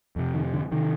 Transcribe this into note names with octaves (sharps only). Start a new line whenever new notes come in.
F2 C3
D#3
D3
C3 D#3